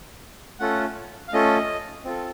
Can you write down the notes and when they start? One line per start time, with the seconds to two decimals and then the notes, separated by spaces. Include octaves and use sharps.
0.59 A3 C#4 F4 A4 F#5
1.28 F5
1.33 A3 C#4 F4 A4 D#5
2.05 C4 F4 A4